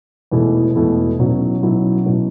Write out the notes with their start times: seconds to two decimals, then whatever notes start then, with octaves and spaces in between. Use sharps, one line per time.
0.31 E1 E2 B2 A3 E4
0.75 E1 E2 B2 A3 E4
1.18 B1 B2 F#3 C#4 E4
1.62 B1 B2 F#3 C#4 E4
2.05 B2 F#3 C#4 E4